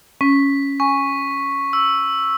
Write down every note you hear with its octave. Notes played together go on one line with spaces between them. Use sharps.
C#4 B6
G#5 C#6
E6